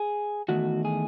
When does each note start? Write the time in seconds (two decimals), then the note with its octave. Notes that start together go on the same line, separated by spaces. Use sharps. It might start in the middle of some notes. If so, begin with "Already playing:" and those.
Already playing: G#4
0.48 E2 D#3 A3 F#4
0.85 G#4